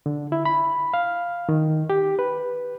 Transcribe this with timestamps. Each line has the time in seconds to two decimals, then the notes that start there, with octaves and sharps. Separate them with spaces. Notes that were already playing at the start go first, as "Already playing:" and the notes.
0.06 D3
0.32 E4
0.45 B5
0.94 F5
1.49 D#3
1.90 G4
2.19 B4